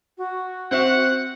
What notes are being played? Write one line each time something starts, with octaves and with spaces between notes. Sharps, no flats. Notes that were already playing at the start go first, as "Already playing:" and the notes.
F#4
C4 C5 E5 F#5